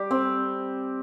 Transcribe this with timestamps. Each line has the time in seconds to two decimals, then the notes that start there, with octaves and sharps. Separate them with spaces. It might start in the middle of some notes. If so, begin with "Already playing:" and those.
Already playing: G3 G4
0.11 C4